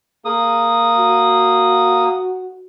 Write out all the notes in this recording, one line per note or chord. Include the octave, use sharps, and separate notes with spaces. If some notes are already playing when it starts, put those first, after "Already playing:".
A#3 G#4 D#6
F#4